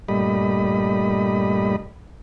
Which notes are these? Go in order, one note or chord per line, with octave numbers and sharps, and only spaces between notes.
G2 A#2 G3 A3 D#5 B5